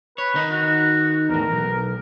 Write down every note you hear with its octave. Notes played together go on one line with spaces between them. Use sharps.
B4 C#5
D#3 D#4
F#4
E2 A2 A#4
B1